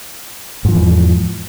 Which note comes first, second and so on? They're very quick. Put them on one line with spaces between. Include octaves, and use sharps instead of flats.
G#2 F3 E3 E2